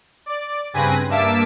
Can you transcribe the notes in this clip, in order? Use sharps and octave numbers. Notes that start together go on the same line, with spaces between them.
D5
G2 C#3 C4 B4 G#5 A#6
G2 A#3 E5 A5 D6 E6